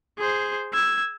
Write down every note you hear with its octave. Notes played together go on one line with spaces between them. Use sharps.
G#4 C5
E6 G#6